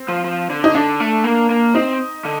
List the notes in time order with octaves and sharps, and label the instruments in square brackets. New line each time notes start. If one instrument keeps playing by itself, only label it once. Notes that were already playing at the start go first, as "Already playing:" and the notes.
Already playing: [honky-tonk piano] C4
[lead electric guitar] F3
F3
D3
[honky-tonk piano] D#4
[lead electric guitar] D3 [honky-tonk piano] D4
[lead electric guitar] A3
A#3
A#3
[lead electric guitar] C4 [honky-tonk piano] D#4
[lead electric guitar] D3